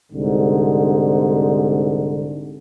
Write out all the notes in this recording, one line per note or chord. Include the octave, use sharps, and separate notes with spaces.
C2 G#2 D3